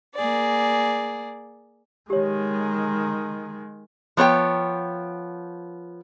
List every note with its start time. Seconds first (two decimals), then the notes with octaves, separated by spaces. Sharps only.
0.16 A#3 G#4 D5
2.10 D#3 G#3 G4 C#5
4.17 F3 B3 C#5 G5